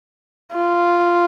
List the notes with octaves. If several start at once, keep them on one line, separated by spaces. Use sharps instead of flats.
F4